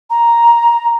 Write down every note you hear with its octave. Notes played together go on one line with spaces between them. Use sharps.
A#5